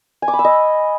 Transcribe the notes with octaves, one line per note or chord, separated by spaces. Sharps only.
G#5
D6
B5
E6
D#5